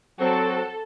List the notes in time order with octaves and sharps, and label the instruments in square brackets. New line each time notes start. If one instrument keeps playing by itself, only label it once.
[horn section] F#3 C4 F#4 [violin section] A4